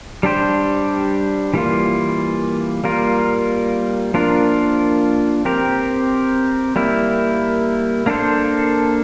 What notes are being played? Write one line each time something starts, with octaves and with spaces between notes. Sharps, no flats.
G3 D4 G4 C5
E3 G3 A#3 F4
G3 A#3 F4 A#4
F3 A#3 D4 F4 A#4
C4 G4 A#4
G3 A#3 E4
A#3 D4 A4 C5